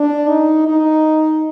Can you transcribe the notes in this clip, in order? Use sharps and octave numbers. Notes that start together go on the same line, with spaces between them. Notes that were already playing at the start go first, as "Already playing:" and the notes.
Already playing: D4
D#4
D#4